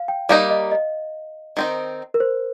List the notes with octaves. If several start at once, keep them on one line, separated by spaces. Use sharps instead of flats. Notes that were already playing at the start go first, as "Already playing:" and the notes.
Already playing: F5
G5
G3 A#3 D#4 F5
D#5
D#5
D#3 C4 D#4
A#4
C5